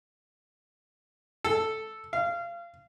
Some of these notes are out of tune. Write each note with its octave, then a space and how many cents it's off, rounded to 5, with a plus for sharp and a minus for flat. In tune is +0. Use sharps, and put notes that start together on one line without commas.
A4 +0
F5 -25